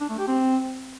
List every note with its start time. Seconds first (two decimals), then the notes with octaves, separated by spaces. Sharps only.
0.01 D4
0.10 A3
0.19 G4
0.28 C4